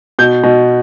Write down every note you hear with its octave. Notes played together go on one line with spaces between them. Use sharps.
B2 G6
B2